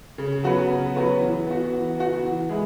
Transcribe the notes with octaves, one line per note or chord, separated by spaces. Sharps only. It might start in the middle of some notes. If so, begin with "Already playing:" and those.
C#3
F#3 B3 F#4 B4
C#3
F#3 B3 F#4 B4
E3
B3 F#4
E3
B3 F#4
E3
G#3 E4 G#4